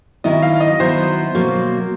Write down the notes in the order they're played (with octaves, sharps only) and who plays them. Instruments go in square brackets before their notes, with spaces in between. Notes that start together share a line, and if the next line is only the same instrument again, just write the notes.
[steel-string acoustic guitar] D#3 F#3 B3 E4 [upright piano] D#5
[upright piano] F5
D#5
[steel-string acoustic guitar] D#3 F#3 B3 E4 [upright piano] C5
[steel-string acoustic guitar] B2 F#3 A#3